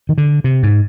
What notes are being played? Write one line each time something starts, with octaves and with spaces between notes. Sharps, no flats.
D#3
D3
C3
G#2